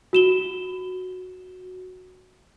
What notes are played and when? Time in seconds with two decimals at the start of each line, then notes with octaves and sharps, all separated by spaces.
0.13 F#4 E7 G7